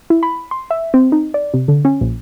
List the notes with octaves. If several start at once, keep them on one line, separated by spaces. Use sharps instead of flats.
E4
B5
C6
E5
C4
D#4
D5
C3
D3
C#4
A#1